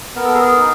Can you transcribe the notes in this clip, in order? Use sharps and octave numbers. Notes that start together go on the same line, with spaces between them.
B3 A#4
A4
G#4 A#4
D#4